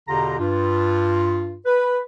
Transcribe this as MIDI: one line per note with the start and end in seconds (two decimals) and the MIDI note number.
0.08 0.36 40
0.08 0.36 47
0.08 0.36 50
0.08 0.36 65
0.08 0.36 67
0.08 0.36 82
0.38 1.58 43
0.38 1.58 65
1.66 1.99 71